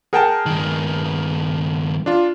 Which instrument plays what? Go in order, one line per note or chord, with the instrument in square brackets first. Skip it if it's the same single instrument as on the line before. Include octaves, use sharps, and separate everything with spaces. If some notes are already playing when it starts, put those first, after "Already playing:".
[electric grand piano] G#4 A#4 [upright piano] F#5 G5 A5
[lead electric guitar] G2 D#3
[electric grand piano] D4 F4